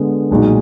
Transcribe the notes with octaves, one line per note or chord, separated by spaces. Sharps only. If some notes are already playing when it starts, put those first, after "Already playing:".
Already playing: D3 G#3 B3
B1 A#2 G#3 D#4 F#4